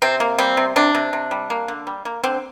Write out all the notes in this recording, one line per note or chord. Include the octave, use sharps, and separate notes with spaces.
C3 C4
A#3
G3 C4
C3
C3 D4
C3
C3
G3
A#3
D3
G3
A#3
D3 C4